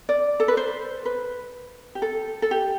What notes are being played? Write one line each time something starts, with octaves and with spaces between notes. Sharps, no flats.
D5
A4
B4
C5
B4
G4
A4
A4
G4